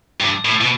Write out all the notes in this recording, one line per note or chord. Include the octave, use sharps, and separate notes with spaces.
G2
A2
B2